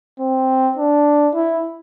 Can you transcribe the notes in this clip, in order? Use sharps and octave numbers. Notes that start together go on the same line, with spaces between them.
C4
D4
E4